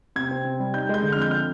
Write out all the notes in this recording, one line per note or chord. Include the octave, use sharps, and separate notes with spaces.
C3 G#6
C4
C3
G3
D#4 G6
G#3 G6
D3
F6
F2 G6
F6